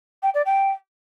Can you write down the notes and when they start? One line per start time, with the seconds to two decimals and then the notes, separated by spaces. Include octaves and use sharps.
0.23 G5
0.34 D5
0.46 G5